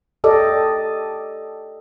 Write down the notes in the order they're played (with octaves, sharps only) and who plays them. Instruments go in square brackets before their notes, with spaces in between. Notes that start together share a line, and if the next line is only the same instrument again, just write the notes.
[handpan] G4 A4 D5 D#5